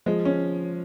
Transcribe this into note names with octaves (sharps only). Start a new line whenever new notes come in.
F3 G#3
C#4